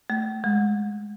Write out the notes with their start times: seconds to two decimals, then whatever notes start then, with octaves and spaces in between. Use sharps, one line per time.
0.10 A3
0.44 G#3